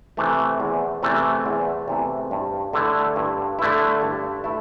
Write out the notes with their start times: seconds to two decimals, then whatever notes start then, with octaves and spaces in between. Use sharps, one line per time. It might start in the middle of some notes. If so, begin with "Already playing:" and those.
0.17 C3 E3 A3
0.60 E2
1.03 C3 E3 A3
1.46 E2
1.88 C3 E3 A3
2.31 G2
2.73 D3 A3 E4
3.16 G2
3.59 D3 A3 E4
4.02 G2
4.44 A3 E4